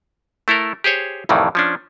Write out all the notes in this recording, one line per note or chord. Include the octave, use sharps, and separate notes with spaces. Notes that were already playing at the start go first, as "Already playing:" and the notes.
A3 E4 A4 A#4
G4 G#4 C5 C#5
C2 F2 A2 D#3 E3
F3 C#4 D4